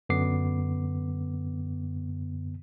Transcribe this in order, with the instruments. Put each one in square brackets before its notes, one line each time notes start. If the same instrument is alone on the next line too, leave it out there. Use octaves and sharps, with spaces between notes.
[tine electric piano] F#2 D3 B3 D6 C7